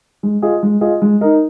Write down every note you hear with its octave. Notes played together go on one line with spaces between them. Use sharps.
G#3
F4 G#4 D#5
G#3
F4 G#4 D#5
G#3
D#4 A#4 D#5